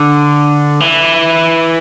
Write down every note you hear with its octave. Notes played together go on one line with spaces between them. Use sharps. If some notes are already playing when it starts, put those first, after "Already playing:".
Already playing: D3
E3